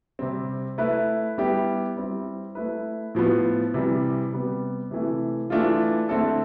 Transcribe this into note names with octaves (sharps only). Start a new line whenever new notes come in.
C3 G3 C4
A3 E4 B4
G3 B3 E4 G4
G3 C4 E4
A3 E4 B4
A2 F3 B3
C3 E3 G3
C3 G3 B3
C3 E3 A3
E3 A3 D4 F4
D3 A3 C4 E4 A4